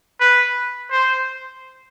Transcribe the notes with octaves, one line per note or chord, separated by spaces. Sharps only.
B4
C5